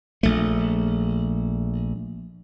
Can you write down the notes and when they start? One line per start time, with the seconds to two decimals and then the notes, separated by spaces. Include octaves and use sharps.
0.23 A#1 A3